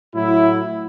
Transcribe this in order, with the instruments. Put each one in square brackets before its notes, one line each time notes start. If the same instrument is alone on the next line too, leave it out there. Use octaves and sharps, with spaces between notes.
[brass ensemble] A2 F#3 E4